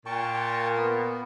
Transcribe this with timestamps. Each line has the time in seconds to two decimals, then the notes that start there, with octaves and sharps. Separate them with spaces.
0.06 A#2 G5 A5 C#6
0.77 B3